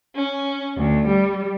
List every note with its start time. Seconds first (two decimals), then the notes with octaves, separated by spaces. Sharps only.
0.15 C#4
0.78 D2
1.06 G3